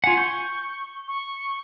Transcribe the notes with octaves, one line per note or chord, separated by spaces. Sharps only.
F4 F#5 G#5
C#6 G6
C#6